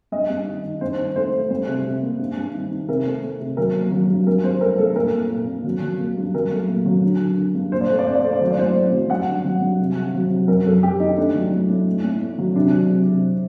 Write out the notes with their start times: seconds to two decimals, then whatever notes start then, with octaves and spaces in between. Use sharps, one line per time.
0.12 G2 D#5
0.30 G2
0.47 D#3
0.64 D#3
0.81 G2 C5
0.99 D#3
1.16 A3 C5
1.33 A3
1.50 G3 C5
1.68 C3
1.85 C3
2.02 A#3
2.19 G2
2.37 G2
2.54 D#3
2.71 D#3
2.89 C3 A#4
3.06 A3
3.23 A3
3.40 C3
3.57 F#3 A#4
3.75 A#3
3.92 F#3
4.09 G2
4.27 G2 A#4
4.43 G2 C5
4.61 A3 A#4
4.78 G2 A4
4.95 A#2 A#4
5.13 A#2
5.30 A#2
5.48 A#2
5.64 F#3
5.82 F#3
5.99 A#3
6.17 G2
6.34 F#3 A#4
6.52 A3
6.68 A#2
6.86 F#3
7.04 D3
7.20 D3
7.37 D3
7.55 G2
7.71 A#2 C5
7.81 D5
7.89 A3 C5
7.99 D5
8.07 A3 C5
8.15 D5
8.24 A3 C5
8.33 D5
8.41 F#3 C5
8.51 D5
8.58 A2 C5
8.75 A2
8.93 F#3
9.10 G2 F#5
9.28 D3
9.45 F#3
9.62 G2
9.79 C3
9.96 C3
10.14 F#3
10.31 C3
10.48 F#2 A#4
10.66 F#2 A4
10.82 F#2 G4
11.00 D#3 D#4
11.18 A3 D4
11.34 F#3
11.52 A2
11.70 A2
11.87 A2
12.04 A2
12.21 A2
12.38 F#3
12.56 C3 D4
12.73 F#3
12.90 C3
13.07 C3